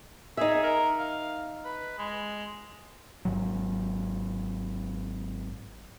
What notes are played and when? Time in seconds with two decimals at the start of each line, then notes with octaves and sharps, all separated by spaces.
0.37 D#4 G#4 E5
0.63 A#4
0.98 F5
1.64 B4
1.98 G#3
3.25 G#1 E2 G#2 F#3